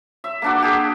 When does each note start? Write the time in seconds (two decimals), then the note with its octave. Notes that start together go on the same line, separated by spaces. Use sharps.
0.24 E5
0.42 A#3 D4 F#4
0.62 G4 G#4